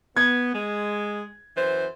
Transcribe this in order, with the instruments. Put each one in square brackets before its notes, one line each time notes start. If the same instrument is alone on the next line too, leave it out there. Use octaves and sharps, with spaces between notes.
[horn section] B3 [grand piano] G#6
[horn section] G#3
F#2 E3 C5